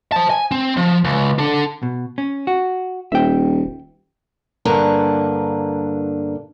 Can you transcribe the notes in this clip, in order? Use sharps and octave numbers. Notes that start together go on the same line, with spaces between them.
C5 A5
G#5
C4
F3
C#2
D4 A4
B2
C#4
F#4
D#1 E5 G5
G2 D3 A#3 D4 B4 A#5